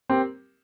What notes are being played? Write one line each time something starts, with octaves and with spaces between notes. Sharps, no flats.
C4 G4 A#4